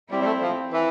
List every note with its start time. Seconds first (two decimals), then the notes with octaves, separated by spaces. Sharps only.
0.10 G3 C4 E4
0.20 G3
0.26 A3
0.41 F3
0.72 E3